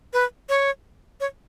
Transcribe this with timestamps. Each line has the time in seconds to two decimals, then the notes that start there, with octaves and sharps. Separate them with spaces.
0.13 B4
0.49 C#5
1.20 C#5